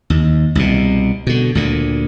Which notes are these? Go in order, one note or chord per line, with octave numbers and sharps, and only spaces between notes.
D#2
C2 B2
B2 D3
D2 A#2 D3